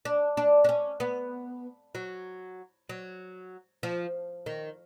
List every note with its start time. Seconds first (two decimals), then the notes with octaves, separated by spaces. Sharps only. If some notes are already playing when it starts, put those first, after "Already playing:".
0.05 D4
0.37 D4
0.64 D4
0.69 C#4
1.00 B3
1.95 F#3
2.89 F#3
3.83 F3
4.46 D#3